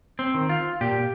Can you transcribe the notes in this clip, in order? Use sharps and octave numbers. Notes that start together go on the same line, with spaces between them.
C4
D#3
F4
A#2 G4